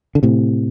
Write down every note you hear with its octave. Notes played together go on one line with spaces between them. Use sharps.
D3
A2 C3